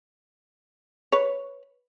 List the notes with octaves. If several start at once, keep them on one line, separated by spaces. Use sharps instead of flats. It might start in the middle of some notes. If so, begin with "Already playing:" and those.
B4 C#5